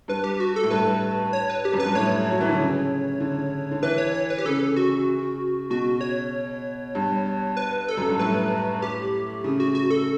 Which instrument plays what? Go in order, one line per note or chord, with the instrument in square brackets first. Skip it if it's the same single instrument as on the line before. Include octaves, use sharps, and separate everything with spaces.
[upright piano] G2 [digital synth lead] B4
[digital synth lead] G4
F#4
A4
[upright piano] A2
[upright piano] G2 [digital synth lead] B4
[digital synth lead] C#5
B4
G4
[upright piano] F#2
[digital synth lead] B4
[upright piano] G2
[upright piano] A2 [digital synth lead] C#5
[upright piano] F#3
E3
D3
C#3
D3
D3
[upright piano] E3 [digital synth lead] B4
[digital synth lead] C#5
C#5
B4
G4
[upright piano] C#3 [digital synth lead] A4
[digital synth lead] F#4
[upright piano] B2 [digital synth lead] F#4
[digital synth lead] C#5
[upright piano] G2
[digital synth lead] B4
A4
[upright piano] F#2
G2
[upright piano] A2 [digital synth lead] B4
[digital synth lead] G4
[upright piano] C#3
[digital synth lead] F#4
F#4
A4